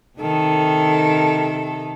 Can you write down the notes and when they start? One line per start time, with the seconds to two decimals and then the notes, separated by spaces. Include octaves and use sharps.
0.19 C3 D#3 A4